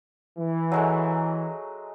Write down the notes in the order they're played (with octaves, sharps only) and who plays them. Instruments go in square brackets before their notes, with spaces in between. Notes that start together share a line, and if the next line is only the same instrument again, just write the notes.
[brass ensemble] E3
[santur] F#3 G#3 A3